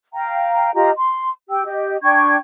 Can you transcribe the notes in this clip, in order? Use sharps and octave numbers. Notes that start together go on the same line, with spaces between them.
F5 G5 A#5
F4 G4 D#5 A#5
C6
G4 G5 E6
G4 D#5
D4 G5 C#6 G#6